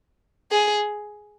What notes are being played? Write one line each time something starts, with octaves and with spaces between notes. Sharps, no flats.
G#4